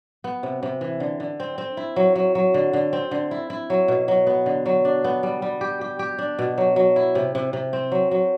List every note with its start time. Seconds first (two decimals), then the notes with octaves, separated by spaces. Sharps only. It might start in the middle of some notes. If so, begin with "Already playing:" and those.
0.24 B3
0.43 C3
0.63 C3
0.81 E3
1.00 D3
1.20 D3
1.40 C4
1.58 C4
1.77 E4
1.96 F#3
2.16 F#3
2.35 F#3
2.54 D3
2.73 D3
2.93 C4
3.11 D3
3.31 E4
3.50 E4
3.70 F#3
3.88 B2
4.08 F#3
4.27 B3
4.46 D3
4.66 F#3
4.85 D4
5.04 B3
5.23 G3
5.42 G3
5.61 G4
5.81 G4
5.99 G4
6.18 D4
6.39 B2
6.58 F#3
6.76 F#3
6.96 E4
7.15 C3
7.35 C3
7.53 C3
7.73 C4
7.92 F#3
8.11 F#3